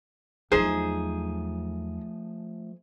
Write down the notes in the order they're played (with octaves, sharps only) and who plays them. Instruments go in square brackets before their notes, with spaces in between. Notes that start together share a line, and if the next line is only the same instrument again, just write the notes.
[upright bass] E2 F#3 [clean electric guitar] F3 A3 [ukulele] D#4 C5 [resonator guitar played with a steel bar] G#4